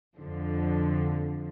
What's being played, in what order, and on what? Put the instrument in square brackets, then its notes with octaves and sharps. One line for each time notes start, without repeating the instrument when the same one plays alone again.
[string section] F2 D3 F3